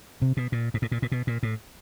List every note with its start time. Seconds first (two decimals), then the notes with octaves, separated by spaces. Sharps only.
0.22 C3
0.37 B2
0.52 A#2
0.74 G#2
0.82 A2
0.92 A#2
1.02 A#2
1.12 B2
1.27 A#2
1.43 A2